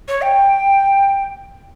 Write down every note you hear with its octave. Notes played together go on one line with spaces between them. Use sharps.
C#5
G5